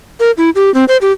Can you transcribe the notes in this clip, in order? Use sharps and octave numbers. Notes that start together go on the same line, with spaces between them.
A#4
E4
G4
C4
C5
G4